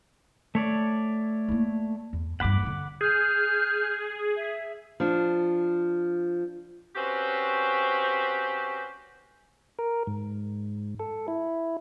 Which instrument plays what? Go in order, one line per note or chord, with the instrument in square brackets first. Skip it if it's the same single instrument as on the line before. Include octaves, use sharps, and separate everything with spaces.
[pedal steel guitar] A3 C#5 D5
[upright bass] A#3 E4
E2
[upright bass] E2 G2 [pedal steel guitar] F#5 B5 D6
[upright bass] D3 C4
[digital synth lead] G#4 [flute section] F6 G6
[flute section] E5
[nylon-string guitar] F3 D4
[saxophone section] C4 C#4 F#4 G4 B4 C5
[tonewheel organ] A#4
G#2
A4
E4